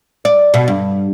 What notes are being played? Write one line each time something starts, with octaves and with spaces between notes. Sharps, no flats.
D5
B2
G2